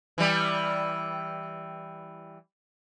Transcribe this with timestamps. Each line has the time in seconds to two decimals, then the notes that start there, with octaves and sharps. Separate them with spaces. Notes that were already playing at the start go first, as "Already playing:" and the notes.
0.18 E3 G3